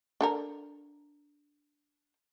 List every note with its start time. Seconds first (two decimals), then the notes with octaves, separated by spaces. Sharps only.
0.21 D4 A4 A#4